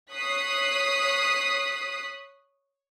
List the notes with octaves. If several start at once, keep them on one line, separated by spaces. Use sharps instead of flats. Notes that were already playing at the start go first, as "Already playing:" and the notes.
C#5 D#6 F#6 B6 C7